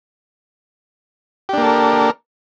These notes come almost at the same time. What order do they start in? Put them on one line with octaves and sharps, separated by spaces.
G4 D4 A#3 A4 A#4